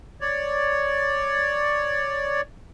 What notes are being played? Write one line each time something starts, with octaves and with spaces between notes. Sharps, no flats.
C#5 D5